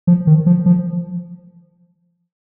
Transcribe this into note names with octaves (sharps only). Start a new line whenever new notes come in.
F3
D#3
F3
F3